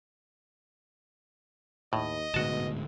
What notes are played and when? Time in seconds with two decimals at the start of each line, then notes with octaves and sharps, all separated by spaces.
1.93 D#2 A2 D#5
2.34 D1 D2 G#2 B2 F#4 A5